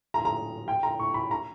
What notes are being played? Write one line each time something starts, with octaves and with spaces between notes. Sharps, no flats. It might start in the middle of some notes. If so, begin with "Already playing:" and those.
A#5
A#5
G5
A#5
C#6
B5
A#5